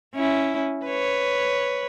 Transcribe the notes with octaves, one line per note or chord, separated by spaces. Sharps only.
C#4 E4
B4 C#5